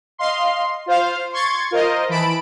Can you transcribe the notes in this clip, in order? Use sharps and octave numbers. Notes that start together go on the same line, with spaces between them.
D#5 F5 C6
F4 C5 F5
C6 C#6 G#6 A6
F4 A#4 C5 D#5
E3 A5 B5 D7